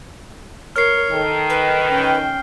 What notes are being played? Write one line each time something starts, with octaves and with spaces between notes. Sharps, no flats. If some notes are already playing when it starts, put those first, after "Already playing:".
A#4 C#5 F6 C7
D#3 A4
B4
C#4 G5